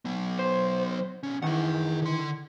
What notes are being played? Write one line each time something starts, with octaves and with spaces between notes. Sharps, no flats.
F#3 B3
C5
B1 C#4
D#3 E3 G#4 F#5
D3 C6